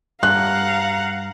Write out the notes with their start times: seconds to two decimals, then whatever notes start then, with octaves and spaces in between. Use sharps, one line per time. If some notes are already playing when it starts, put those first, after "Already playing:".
0.23 G2 F5 F#5 A#5 F#6